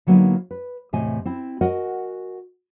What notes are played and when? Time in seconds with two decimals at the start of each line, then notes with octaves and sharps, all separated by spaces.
0.07 D3 F#3 A#3 B3 D#4 E4
0.51 B4
0.93 E2 A2 C3 D#5 G#5
1.25 C4 E4
1.61 F#4 A#4 D#5 F#5 G#5